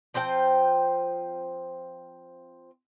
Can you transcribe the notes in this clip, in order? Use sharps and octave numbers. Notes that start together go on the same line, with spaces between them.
F3 C4 C5 G5